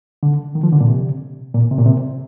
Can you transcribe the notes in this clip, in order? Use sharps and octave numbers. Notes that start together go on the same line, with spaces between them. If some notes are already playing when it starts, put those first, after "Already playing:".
D3
D#3
F3
D3
A#2
C3
A#2
C3
A#2
C3